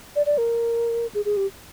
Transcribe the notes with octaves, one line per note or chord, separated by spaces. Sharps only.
D5
D5
A#4
G#4
G#4
G4